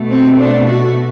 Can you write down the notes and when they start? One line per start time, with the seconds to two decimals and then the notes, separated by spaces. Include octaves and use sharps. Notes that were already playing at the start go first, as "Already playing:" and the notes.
Already playing: B2 A3
0.09 C4
0.39 D4
0.67 F#4